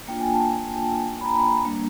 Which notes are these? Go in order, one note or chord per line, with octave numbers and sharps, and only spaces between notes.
A#3 D4 F4 G5
G#5
A5
B5
A#5
G3 A#3 D4